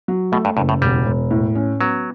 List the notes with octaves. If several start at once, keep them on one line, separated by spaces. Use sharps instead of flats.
F#3
B2 A3
G2
F#1 G2
A2
E1 G3
E1
A2
C#4
F#3 B3